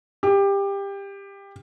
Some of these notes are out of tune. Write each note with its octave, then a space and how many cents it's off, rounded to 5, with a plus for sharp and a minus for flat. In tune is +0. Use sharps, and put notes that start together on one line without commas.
G4 +20